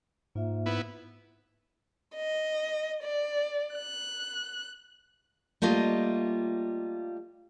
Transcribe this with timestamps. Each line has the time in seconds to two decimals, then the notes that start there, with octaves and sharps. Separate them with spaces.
0.35 G#2 A#3 F4 E5
0.66 B3 E4
2.16 D#5
3.03 D5
3.75 F#6
5.62 G3 A3 A#3 F4 D#5